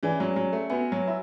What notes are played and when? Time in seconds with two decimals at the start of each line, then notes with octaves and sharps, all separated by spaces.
0.03 E3 C#4 G#4 D5 G#5
0.20 F#3
0.36 F#3
0.53 A3
0.70 B3 F#4 B4 E5 G#5
0.92 F#3
1.07 E4